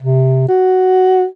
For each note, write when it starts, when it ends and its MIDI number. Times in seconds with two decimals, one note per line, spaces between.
0.02 0.48 48
0.48 1.25 66